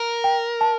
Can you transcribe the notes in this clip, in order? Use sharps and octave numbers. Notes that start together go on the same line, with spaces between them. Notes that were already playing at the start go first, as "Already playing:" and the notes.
Already playing: A#4
G5
A5